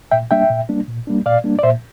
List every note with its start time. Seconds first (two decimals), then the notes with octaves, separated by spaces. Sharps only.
0.11 A#2 E5 G5
0.31 G3 A#3 D4 E5 G5
0.50 A#2
0.69 G3 A#3 D4
0.88 A#2
1.07 G3 A#3 D4
1.25 A#2 D5 F5
1.44 G3 A#3 D4
1.59 D5
1.63 A#2 C5 E5